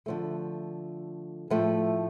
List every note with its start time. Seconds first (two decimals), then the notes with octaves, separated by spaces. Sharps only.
0.06 D3 F3 A3
1.50 A2 F3 A3